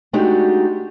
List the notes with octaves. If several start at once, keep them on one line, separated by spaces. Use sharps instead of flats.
G#3 A3 D4 D#4 F#4 G4